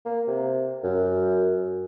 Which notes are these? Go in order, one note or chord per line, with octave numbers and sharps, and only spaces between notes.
A#3
C3
F#2